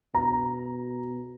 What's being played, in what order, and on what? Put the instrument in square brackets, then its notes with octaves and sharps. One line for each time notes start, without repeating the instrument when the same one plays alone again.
[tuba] B2 [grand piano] A#5